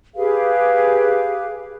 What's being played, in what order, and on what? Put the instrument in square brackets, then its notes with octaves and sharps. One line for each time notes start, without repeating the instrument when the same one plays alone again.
[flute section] G4 G#4 B4 F5